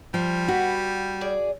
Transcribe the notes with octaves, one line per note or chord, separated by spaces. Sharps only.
F3 G3
B3 F#4
G#4 D5